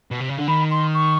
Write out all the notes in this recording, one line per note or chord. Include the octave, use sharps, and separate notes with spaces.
B2
C3
C#3
D3
D#3 B5
C6
C#6